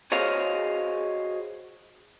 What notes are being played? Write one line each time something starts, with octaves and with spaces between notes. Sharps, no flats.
F#4 G#4 C5 C#5 D#5 F5